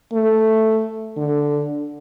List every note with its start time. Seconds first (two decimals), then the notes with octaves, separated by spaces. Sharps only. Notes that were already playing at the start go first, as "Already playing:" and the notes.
0.13 A3
1.17 D3